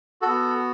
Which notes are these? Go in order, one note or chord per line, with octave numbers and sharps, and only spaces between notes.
B3 F#4 A4